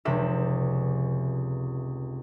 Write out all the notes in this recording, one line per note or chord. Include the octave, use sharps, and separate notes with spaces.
F1 C#2 C3 E5